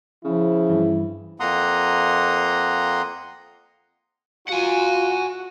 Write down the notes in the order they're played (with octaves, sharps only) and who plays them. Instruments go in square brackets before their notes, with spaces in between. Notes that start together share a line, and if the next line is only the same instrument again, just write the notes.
[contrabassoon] C#3 [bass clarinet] F3 [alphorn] E4
[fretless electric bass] G2 E3
[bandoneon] F2 A#3 F#5 A#5 C6 D#6
[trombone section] F4 [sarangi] F#4 [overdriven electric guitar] F#5 G#5